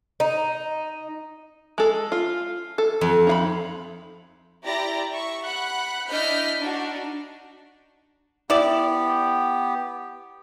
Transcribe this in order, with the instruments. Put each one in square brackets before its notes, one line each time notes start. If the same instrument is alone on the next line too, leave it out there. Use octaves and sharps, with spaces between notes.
[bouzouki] D#4
[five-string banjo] G#3 A4
F4
A4
[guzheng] F2
[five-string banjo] D#4 F5 B5
[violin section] E4 G4 D5 A#5 A#6
E5 C#6
F#5 B5 F#6
D4 E4 D#5 F6 G6 B6
D4 D#4 F#4
[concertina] B3 G4 [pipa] E4 D5